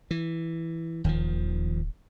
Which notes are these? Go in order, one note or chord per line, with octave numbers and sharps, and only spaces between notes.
E3
D1 D#2 D#3 F3